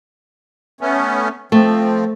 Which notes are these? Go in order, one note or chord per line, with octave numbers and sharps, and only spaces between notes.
A3 B3 C#4
F3 A3 C4